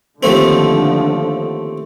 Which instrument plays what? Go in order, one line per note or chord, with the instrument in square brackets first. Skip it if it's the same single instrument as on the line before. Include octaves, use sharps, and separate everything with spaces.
[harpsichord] D#2 A3 C4 [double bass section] D3 F3